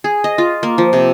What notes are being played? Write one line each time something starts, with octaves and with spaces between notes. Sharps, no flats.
G#4
D#5
F4
A#3
F3
C3